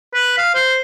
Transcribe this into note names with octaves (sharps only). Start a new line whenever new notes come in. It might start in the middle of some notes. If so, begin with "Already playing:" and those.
B4
F5
C5